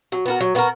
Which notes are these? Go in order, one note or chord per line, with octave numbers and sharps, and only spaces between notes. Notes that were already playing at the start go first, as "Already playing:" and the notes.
F#3
B3 F#4 A#4
F#3
B3 F#4 A#4